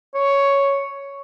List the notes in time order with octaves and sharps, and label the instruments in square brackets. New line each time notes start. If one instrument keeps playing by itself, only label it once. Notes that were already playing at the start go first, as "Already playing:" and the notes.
[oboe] C#5